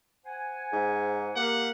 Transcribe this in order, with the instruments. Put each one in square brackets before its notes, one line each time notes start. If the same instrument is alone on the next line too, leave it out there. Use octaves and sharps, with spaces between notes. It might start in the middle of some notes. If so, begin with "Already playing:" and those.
[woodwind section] C5 F#5 G#5
[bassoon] G#2 [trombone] G#4
[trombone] A#3 [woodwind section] G4 F5 [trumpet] F#5